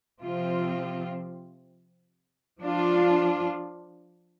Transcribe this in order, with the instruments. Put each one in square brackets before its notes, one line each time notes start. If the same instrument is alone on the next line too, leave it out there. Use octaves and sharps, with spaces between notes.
[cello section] C3 F3 C4 F4
F3 D4 F4